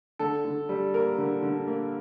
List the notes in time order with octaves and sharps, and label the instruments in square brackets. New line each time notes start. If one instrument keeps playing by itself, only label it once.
[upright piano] D3 A4
D3
G3
A#3 A#4
D3
D3
A#3